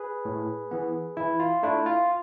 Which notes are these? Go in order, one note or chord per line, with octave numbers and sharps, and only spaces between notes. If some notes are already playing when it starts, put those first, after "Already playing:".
Already playing: G#4 B4
A2
E3 B3
E3 E4
F4
A3 D4 E4
F4